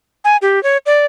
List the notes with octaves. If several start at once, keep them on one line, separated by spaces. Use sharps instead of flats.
G#5
G4
C#5
D5